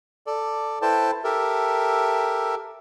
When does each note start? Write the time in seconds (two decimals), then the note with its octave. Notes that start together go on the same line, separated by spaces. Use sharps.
0.27 A4 D5
0.82 E4 A4 B4 C5 G5 A5
1.24 G4 A4 A#4 E5